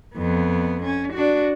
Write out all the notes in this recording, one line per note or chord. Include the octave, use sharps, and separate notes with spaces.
F2 B3
C#4
D4 F#4